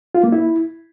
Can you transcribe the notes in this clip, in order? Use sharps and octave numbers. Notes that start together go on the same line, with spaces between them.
F4
A#3
E4